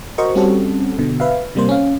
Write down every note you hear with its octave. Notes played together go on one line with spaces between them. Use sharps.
F#4 A#4 C5 D#5 C#6
G3 C4 C#4 F#4 G4 A4
B2 D3
B4 E5 F5
C3 G3 A#3 C5
C#4 F5